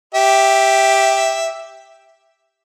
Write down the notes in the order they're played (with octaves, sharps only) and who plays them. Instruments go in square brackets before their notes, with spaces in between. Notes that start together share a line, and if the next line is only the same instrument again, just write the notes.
[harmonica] G4 E5